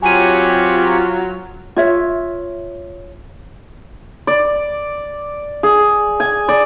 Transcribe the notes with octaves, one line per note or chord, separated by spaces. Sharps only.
F#3 C4 F4 G4 C#5 G#5 D#7
F4 C#5 E5
D5
G#4
G#5
D5